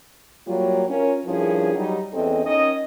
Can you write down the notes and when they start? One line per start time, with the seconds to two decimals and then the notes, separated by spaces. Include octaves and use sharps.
0.47 F#3 G3 A#3 F4 C#5
0.88 C#4 F4 A#4
1.26 G2 F3 C#4 E4 G#4 A#4
1.75 F#3 G3 D#4
2.12 E2 C4 C#4 A4 D#5
2.43 D#3 C#4 D#5